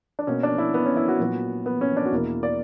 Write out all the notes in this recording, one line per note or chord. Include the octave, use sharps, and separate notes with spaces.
D4
B2 A#3 C#4
D4
E4
B3
C#4
E4
F#4
A#2 F#3 B3
B3
C#4
D4
F#4
E2 B2 A#3 E4
D5